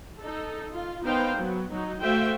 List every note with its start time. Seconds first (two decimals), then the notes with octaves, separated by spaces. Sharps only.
0.20 D#4 A4
0.73 F4
1.04 B3 D#4 A#4 C5 F5 G5
1.38 F#3 B3
1.71 F#3 D#4
2.03 A3 F#4 C5 E5 F5 G5